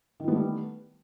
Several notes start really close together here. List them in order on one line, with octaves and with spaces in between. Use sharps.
D#3 E3 B3 A3 G3